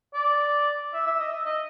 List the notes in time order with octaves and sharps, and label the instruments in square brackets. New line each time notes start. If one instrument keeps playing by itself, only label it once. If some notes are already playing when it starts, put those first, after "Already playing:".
[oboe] D5
E5
E5
D#5
E5
D#5